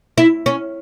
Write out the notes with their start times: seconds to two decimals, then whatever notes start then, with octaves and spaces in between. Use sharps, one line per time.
0.18 E4
0.46 C#4